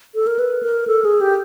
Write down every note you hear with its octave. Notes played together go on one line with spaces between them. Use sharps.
A4
A#4
B4
A#4
A4
G#4
G4